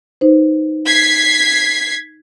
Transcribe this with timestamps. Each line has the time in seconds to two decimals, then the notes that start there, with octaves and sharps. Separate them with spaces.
0.21 D#4 B4 C5
0.87 G#6 B6 C7